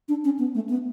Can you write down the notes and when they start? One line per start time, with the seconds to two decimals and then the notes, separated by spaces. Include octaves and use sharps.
0.09 D4
0.24 C#4
0.39 B3
0.55 A3
0.69 B3